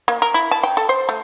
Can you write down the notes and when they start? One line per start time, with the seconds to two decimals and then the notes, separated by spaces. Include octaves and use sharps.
0.08 A#3
0.22 A#4
0.34 E4
0.51 A5
0.63 G5
0.77 A4
0.89 C5
1.09 A3